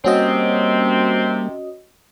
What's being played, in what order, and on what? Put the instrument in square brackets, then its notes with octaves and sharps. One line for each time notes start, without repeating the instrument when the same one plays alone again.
[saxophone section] C3 C4 [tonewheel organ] G3 A#3 [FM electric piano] C#4 F#4 D#5